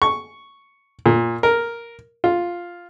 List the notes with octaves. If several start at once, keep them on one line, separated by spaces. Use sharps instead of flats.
C#6
A#2
A#4
F4